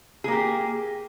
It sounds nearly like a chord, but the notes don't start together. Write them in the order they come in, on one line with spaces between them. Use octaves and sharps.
G#4 A#3 G4